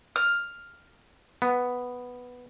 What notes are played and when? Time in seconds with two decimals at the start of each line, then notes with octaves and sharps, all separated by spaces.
0.16 F6
1.42 B3